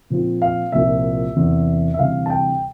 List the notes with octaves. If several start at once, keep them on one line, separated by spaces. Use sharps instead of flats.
A#2 F3 C4 F4
F5
C2 A#2 F3 A#3 F4 E5
E2 C3 E3 A#3
E5
D2 C3 E3 G3 F5
A5
G5